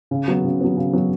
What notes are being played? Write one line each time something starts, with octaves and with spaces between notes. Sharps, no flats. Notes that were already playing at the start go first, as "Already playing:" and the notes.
C#3
F#3 B3
C#3
F#3 B3
C#3
F#3 B3